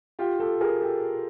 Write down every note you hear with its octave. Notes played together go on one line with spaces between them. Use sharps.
F4 G4
G4 A4
G#4 A#4
G4 A4